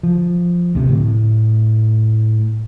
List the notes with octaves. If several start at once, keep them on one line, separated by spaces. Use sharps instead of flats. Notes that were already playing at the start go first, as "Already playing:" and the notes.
F3
D2 C3
A2